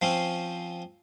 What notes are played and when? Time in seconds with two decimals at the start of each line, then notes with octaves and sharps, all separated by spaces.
0.02 F3 C4 C#4